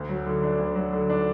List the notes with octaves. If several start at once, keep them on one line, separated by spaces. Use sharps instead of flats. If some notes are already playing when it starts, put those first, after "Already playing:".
Already playing: D2
F#3
D3
D4
D2
F#3
D3
D4